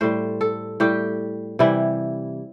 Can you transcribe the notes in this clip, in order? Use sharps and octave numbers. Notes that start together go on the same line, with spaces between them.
A2 G3 C5
A4
A2 G3 G4
C3 E3 G3 E4